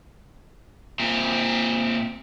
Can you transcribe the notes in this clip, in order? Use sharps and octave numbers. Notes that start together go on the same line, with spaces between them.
A#2 C4